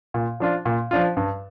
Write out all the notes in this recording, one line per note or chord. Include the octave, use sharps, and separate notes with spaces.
A#2
F3 D4 F4
A#2
F3 D4 F4
G2